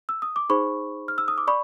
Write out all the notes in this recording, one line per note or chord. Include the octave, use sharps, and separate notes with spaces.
E6
D#6
D6
D#4 G#4 C5 B5 C#6
F6
E6
D#6
D6
D5 B5 C#6